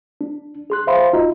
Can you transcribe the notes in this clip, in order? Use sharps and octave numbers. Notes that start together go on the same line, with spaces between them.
D4
G#4 C6 F#6
C5 E5 F5 B5 C6
D#4 F4 F#4 D#5 A#5